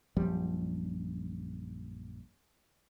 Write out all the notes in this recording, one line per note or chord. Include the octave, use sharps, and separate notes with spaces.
A#1 F#2 F3 G3